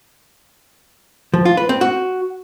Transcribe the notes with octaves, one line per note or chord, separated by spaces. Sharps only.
F3
F4
B4
C4
F#4